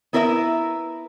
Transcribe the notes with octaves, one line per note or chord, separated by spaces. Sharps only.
B3 E4 A#4 B4 D#5 E5